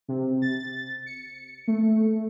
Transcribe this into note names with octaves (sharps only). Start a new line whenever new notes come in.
C3
A6
C#7
A3